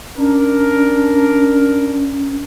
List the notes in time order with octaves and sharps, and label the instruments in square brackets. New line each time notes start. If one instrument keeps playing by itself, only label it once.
[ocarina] C#4 [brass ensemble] D4 A#4